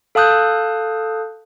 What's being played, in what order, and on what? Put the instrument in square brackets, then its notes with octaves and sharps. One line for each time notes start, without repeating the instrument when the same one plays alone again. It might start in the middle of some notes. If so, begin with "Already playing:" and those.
[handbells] A4 F5 A5 D#6 F#6 G6